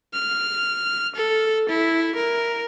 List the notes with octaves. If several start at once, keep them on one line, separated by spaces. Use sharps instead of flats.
F6
A4
E4
A#4